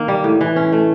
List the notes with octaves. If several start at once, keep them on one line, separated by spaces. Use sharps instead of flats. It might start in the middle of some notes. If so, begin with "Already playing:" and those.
Already playing: D#3 A#3
G3
A2
E3
C#4
A3